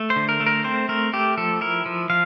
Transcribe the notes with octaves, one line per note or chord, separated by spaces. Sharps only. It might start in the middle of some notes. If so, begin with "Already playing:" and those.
Already playing: A3
C5
D3
A#4
A3
A#4
C4 C5
A3 A#4
A3 G4
F3 A4
E4 A#4
F3
F3 F5